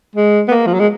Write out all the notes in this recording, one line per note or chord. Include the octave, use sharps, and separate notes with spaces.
G#3
B3
A#3
F3
F#3
G#3